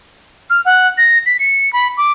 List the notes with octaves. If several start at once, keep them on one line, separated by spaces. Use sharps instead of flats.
F6
F#5
A#6
B6
C#7
B5
D6